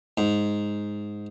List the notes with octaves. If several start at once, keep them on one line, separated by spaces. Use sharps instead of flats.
G#2